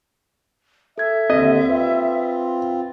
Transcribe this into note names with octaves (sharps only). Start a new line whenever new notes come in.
A4 E5 G#6
D#2 D3 C4 D#5
C4 F4 B4